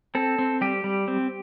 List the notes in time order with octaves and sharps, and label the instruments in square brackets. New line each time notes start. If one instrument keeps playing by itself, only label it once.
[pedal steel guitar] C4 A4
C4
G3 G4
G3
C4